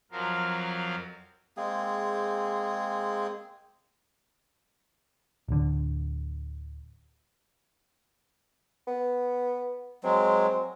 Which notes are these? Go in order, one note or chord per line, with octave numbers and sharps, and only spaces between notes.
F2 F3 F#3 A#4 F5
G#3 A#3 C4 G#4
D1 D3
B3
F#3 G#3 C4